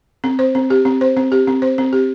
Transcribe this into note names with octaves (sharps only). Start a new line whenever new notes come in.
C4
C5
C4
G4
C4
C5
C4
G4
C4
C5
C4
G4